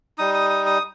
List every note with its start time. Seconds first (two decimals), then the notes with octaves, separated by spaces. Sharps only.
0.18 G3 D#4 D#6
0.34 D#6
0.50 D#6
0.66 D#6